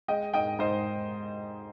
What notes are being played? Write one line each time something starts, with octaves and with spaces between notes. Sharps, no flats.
G#3 D#5 G5
G#2 D#5 G5
G#2 C5 D#5